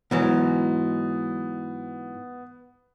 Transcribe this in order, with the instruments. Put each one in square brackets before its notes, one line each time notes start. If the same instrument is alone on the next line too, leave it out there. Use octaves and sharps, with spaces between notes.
[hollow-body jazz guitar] G#2 E3 F#3 [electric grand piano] B3